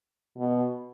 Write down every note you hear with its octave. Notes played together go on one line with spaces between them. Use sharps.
B2